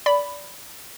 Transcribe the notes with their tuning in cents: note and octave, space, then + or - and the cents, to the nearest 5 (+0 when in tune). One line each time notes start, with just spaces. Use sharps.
D5 -20 B5 +5